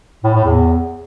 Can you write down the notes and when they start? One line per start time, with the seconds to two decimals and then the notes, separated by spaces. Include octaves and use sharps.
0.24 A2
0.34 A2
0.44 E2